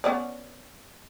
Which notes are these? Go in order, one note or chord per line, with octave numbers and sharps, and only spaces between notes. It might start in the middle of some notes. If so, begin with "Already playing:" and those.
B3 C#4 D5